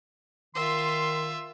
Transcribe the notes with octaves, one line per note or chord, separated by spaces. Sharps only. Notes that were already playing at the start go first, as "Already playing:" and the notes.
D#3 F4 E5 C6